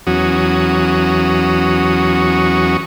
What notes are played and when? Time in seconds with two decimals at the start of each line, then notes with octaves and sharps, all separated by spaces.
0.07 E2 F#3 C#4 F#4 D#6